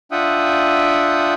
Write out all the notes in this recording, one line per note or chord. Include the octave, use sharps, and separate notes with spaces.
D4 F4 E5 F#5 G5 D#6